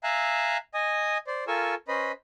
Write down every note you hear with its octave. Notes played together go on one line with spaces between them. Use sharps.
E5 F5 G#5 A#5 E6 F#6
D#5 G#5 D#6
C5 D5
F4 A4 A#4 G#5 C#6 E6
C#4 B4 C5 D#5 B5